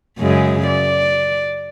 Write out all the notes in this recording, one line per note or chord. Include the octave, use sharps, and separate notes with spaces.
F#2 C#3 G#3
D5